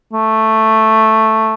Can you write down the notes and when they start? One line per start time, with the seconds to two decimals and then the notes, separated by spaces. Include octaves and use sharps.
0.13 A3